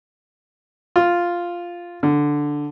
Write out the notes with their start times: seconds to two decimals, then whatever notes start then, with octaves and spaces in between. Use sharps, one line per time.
0.96 F4
2.03 D3